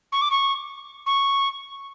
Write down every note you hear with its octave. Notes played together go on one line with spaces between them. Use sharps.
C#6
D6
C#6
C#6